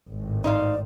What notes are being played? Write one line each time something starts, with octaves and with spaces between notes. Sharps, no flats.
G#1 A2
D#4 C5 D5 F5